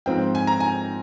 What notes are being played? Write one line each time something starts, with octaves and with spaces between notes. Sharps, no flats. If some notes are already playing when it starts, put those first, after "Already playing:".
G#2 F3 C4 F4 G5
G#5
A#5
G#5